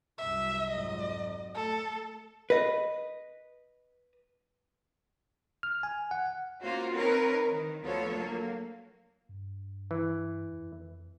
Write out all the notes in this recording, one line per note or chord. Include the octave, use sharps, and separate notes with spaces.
C2 F#2 E5
F2 G#2 F#3 D#5
A3 A4
B4 D#5
F6
G#5
F#5
A#3 C#4 F4 F#4 C5
C4 D#4 A#4 B4 C#5
D#3
D2 F3 B3 F4 A4 C#5
F#3 A#3
G2
E3
F2